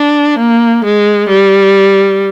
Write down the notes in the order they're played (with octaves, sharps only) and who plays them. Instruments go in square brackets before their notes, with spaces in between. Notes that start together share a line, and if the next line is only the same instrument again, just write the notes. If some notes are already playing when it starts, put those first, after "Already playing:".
Already playing: [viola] D4
A#3
G#3
G3